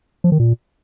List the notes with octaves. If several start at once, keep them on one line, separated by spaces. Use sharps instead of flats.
F3
D#3
A#2